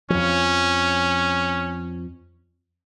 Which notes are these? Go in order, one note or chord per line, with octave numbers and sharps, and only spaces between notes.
F2 F3 C#4